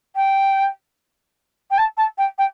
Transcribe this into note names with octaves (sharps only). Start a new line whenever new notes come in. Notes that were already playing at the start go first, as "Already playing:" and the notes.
G5
G5
A5
A5
G5
G5